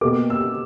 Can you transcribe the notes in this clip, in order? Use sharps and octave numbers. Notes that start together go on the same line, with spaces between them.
B2 A#3 D6
E6